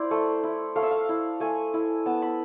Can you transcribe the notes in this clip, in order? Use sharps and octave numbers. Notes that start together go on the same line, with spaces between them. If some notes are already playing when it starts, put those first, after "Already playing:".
Already playing: E4 C5 D5
A3
E4
A3 F5
E5
F5
E4
A3 G#5
E4
B3 A5
B5